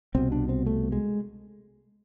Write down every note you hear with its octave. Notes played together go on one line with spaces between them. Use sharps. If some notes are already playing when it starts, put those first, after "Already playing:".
C2 B2 C4
D4
C4
A3
G#3